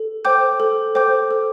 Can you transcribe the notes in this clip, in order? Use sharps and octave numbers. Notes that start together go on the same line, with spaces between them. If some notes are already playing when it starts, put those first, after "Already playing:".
Already playing: A4
C5 G5 D6 G6
A4
C5 G5 D6 G6
A4